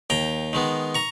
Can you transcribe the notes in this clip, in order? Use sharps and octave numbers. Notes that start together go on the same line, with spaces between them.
D#2 G5 A#5
D#3 G#3 B3
A#5 C#6